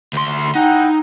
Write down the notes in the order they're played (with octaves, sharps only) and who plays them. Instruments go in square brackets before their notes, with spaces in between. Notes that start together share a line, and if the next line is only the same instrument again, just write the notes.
[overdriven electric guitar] D2 C6
[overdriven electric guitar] D#4 [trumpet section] E4 F#5 G5